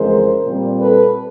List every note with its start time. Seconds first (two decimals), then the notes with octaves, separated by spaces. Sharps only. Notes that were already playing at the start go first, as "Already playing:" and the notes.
Already playing: F2 C#3 E3 G#3 A#4 C5
0.44 A#2 G3 C4
0.81 A4 B4